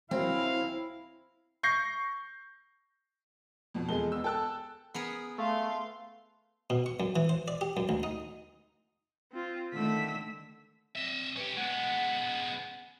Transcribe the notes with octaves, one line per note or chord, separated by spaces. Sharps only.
E3 F#3 A#3 C4 E4 F5
C#6 G6 A#6 C7
F2 B2 F3
E2 G#3 G#4 A4 G7
B3 E6
A4 G5 A5 E6 F#6
B3 G#4 A#4
A3 F5 C6
B2
C#6
F#2
E3
C5
D5
G4
F#2
D2
D#4
C4 F4
D3 D#3 A3 E6 B6
C4 D#5 E5
C#4 G4 B4
G#3 B3 F#5